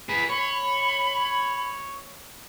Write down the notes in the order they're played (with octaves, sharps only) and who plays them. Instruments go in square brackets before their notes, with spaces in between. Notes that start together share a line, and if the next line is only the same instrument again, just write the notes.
[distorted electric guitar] G#4 B4 [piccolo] B6
[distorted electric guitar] C#5 [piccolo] B5